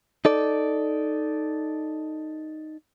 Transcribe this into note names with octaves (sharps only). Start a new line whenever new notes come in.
D#4 A4 D5